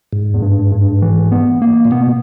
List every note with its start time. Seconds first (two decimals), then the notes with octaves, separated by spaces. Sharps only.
0.13 G#2
0.34 E2
0.42 G2
0.72 G2
1.02 E3
1.31 B3
1.62 A#3
1.85 A#2
1.91 B2 B3